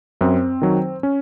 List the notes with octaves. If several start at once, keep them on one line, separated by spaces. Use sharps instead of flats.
F#2 C4
D#3 F#3
C#4